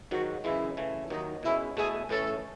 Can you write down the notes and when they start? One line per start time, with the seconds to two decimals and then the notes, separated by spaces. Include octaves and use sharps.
0.11 G#2 D#3 F#3 F#4
0.44 F#2 C#3 E3 G#3 E4
0.77 C#3 E3 A3
1.07 E4
1.10 D#2 D#3 F#3 D#4
1.43 B2 G#3 C#4 E4
1.77 B2 A3 E4 G#4 A4 E5
2.09 A2 E3 A3 C#4 A4